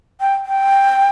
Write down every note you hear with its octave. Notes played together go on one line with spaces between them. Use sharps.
G5
G5